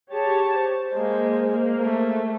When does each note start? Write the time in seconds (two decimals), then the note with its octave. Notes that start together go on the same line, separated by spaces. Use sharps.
0.12 G4 G#4 C#5 A5
0.55 C5
0.95 G#3 A#3
1.51 A#3
1.83 A3